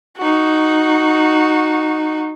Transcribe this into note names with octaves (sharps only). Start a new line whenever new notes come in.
D#4 F#4